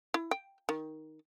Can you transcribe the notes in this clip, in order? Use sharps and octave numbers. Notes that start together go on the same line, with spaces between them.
E4
G5
D#3